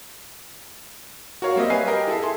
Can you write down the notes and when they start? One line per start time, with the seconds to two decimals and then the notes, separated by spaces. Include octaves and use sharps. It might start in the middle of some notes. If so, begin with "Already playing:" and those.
1.42 F#4 A#4 C#5 F5
1.56 G3 A#3 C4 D#5 E5
1.70 B4 F5 G#5 C7
1.87 G4 A#4 D#5 G#5
2.07 E4 G#4 A4 E5
2.22 G#4 A4 C6